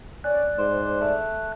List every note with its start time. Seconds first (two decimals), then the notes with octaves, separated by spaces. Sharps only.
0.24 C#4 D5 F#6
0.58 G#2 C5
1.01 A3